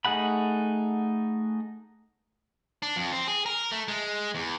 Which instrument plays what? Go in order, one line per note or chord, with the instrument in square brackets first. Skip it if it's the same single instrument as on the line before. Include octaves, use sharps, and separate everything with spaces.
[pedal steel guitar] A3 D#4 G#4 F#5 B5
[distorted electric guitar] D4
F2
C4
G#4
A#4
A3
G#3
E2